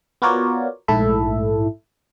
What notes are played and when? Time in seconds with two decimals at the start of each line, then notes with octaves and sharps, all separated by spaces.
0.22 B3 F4 F#4 A#4 C#5 D5
0.88 A#1 G#2 A3 E4 A4 E5